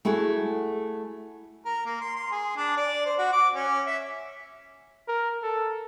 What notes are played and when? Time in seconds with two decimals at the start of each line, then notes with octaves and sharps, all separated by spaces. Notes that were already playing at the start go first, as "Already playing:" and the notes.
0.05 A3 E4 F#4 G#4
1.65 A#4
1.86 A#3
2.01 C6
2.16 C6
2.32 G#4
2.57 D4
2.77 D5
3.06 C5
3.18 F#4
3.33 D6
3.55 C#4
3.86 E5
5.08 A#4
5.43 A4